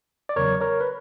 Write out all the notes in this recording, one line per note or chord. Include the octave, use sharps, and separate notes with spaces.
D5
E2 C#3 F#3 A#4 C#5
A#4 C#5
B4